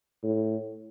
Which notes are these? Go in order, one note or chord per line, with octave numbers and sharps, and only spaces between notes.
A2